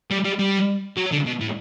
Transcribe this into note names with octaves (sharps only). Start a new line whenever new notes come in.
G3
G3
G3
F#3
D3
B2
A2